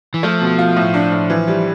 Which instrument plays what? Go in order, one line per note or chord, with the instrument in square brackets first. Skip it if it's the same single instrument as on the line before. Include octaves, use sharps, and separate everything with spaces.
[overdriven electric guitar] E3
[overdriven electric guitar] F3 [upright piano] A3
[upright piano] B2
F4
A2
D4
A2
E3
G3